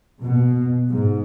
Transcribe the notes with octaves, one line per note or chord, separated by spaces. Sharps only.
B2
G#2